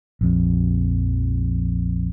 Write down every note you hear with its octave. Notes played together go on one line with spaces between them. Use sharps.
A#1 F2